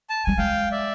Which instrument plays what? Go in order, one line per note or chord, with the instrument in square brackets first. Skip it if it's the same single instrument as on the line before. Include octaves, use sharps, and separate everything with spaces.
[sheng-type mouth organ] A5
[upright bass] G3 [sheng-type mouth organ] G#5
[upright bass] G#3 [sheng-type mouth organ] F5 G5
[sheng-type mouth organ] D5 E5